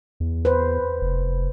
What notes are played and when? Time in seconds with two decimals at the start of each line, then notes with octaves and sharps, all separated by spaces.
0.20 E2
0.45 B4 C5
1.01 F1